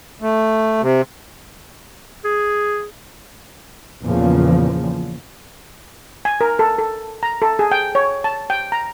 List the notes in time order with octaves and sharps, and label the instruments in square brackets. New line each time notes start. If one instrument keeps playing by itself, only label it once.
[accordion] A3
C3
[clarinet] G#4
[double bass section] E2 A#2 C#3 F3
[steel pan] G#5
A#4
A4
A4
A#5
A4
G#4
G5
C#5
A5
G5
A#5